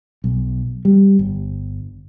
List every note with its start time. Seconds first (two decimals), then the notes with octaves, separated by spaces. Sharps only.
0.24 B1
0.85 G3
1.19 G1